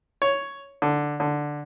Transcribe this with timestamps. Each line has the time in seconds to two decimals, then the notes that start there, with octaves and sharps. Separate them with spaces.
0.22 C#5
0.82 D3
1.20 D3